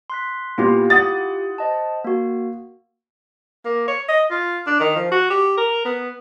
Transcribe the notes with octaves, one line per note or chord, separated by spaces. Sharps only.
C6 F#6 B6
A#2 B3 E4 F4 G4 C6
F#5 D#6 A6
C5 D#5 A5
A#3 F#4
A#3
C#5
D#5
F4
D4
D#3
F3
F#4
G4
A#4
B3